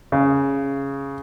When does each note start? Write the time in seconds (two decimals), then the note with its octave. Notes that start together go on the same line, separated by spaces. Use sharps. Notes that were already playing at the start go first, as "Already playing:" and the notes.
0.12 C#3